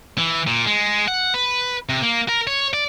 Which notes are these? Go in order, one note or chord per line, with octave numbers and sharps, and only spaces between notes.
E3
A#2
G#3
F#5
B4
C3
A#3
A#4
C#5
D5